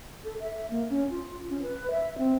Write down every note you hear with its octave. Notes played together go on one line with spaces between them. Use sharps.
A4
E5
A#3
C#4
F4
C#4
B4
E5
C4